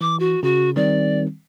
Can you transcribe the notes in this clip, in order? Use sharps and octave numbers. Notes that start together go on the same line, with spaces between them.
E3 D6
F#4
C#3 F#4
D#3 G3 C4 D5